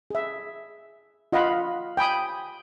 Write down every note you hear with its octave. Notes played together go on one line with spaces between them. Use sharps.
G#4 E5
F4 D#5 F5 F#5 B5
G5 G#5 B5 D#6